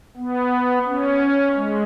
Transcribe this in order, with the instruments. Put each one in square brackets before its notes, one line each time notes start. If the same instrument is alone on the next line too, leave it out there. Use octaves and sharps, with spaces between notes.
[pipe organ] B3
C#4
G#3